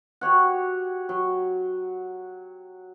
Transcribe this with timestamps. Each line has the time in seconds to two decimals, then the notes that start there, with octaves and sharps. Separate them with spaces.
0.21 F#4 G4 C#5 F#5
1.09 F#3